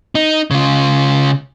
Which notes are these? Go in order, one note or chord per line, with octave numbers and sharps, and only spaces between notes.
D#4
C#3 F4